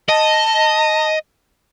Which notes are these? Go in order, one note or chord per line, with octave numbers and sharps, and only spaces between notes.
D#5 A5